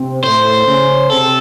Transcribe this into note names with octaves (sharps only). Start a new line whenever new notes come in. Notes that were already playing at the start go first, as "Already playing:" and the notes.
Already playing: C3 C4
A2 A3 C5
C#3 C#4
C3 C4 A4